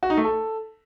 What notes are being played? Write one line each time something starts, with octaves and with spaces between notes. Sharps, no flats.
F#4
D#4
A3
A4